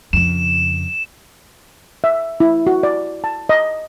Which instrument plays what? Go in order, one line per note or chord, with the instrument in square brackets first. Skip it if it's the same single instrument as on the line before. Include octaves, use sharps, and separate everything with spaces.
[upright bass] F2 C#3 [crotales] E7
[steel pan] E5
E4
F#4
D5
A5
D#5